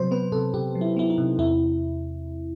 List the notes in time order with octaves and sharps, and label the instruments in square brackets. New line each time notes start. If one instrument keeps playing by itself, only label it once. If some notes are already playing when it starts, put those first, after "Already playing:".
Already playing: [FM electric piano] C3 F#3 C5
B3 B4
C3 A4
C3 G4
F#3
E4
B3 E4
D#4
C3
E2 E4